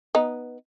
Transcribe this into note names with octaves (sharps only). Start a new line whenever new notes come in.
B3 D#4